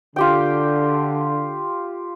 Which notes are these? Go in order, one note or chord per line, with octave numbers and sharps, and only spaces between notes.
D3 F4 G4 G5